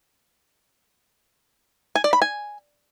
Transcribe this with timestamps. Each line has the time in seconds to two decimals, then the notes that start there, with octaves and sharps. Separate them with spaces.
1.95 G#5
2.04 D5
2.13 B5
2.22 G#5